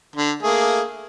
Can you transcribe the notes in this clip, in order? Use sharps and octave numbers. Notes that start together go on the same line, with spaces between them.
D3
A3 A#3 G#4